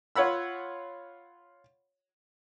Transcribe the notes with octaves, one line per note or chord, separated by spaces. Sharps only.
F4 C#5 F#5 B5 E6